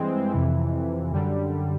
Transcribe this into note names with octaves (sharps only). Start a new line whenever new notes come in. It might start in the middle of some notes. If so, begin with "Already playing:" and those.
Already playing: G2 E3 G#3 C4
F2 C3 E3
F#2 D3 G3